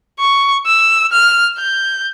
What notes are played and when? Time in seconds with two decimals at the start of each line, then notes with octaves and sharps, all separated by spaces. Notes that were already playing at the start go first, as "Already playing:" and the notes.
0.20 C#6
0.66 E6
1.12 F6
1.59 G6